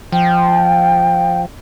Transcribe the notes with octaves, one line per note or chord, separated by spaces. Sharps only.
F3 G5